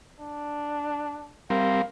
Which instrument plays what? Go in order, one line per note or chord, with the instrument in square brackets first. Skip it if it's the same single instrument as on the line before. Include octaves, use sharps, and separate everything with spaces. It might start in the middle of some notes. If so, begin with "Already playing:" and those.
[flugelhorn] D4
[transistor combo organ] G3 C4 A#4 [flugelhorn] F5